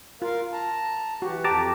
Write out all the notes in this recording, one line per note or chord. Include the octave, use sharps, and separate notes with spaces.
F4 A#4 F5
A5 A#5
E3 F#4 G4
F2 G4 A5 A#5 D6